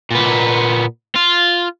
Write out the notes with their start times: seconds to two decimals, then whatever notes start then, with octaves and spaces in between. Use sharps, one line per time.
0.11 A#2 B3
1.16 F4